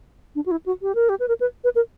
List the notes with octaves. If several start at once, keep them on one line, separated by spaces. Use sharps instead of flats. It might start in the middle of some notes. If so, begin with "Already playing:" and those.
D4
F#4
E4
F#4
G4
A#4
G4
B4
A#4
B4
B4
A#4